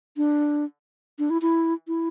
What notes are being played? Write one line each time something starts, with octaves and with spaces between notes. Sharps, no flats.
D4
D4
E4
E4
E4